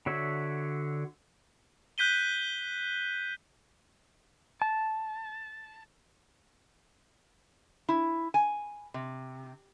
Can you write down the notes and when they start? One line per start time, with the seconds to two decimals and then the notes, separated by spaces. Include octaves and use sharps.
0.06 D3 F#4 C#5 E5
1.98 F#6 G6 B6 D#7 G7
4.62 A5
7.89 E4
8.34 G#5
8.94 C3